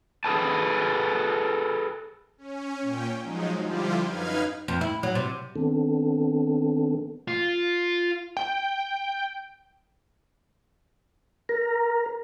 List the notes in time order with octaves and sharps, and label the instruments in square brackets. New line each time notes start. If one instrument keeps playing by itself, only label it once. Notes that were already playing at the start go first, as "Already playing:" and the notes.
[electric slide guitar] G#4 A4 B4 A5
[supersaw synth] C#4
A#2 C#4 G5
F3 F#3 G#3 D#4
D3 F3 G3 E4 F4 G4
F#2 D#4 B4 F5 F6 G#6
[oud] F2
E4
F#3
C3
[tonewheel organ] D#3 B3 C4 D4 A4
[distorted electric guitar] F4
[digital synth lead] G5
[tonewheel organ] A#4